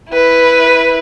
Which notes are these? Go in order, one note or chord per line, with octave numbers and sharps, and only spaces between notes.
E4 B4